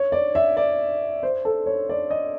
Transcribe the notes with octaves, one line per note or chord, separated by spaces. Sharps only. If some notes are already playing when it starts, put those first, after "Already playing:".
Already playing: C#5
D5
E5
D5
C5
A4
C#5
D5
D#5